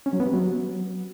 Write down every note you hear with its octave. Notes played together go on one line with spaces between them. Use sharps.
C#4
F#3
B3
C3
F#3